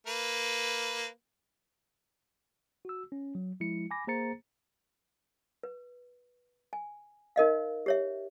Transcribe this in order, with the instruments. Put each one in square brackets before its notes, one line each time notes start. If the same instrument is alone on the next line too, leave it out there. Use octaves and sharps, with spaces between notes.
[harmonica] A#3 B4
[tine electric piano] F#4 E6
C#4
F#3
F3 G#3 E4 C#7
G#5 B5 D6 A#6
A#3 G#4 C5 A#5 A6 C#7
[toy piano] B4
G#5
D#4 A#4 D#5 F5
G4 C#5 E5